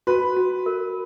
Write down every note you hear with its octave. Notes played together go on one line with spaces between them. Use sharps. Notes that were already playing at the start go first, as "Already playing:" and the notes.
F#4 B4
F#4
A#4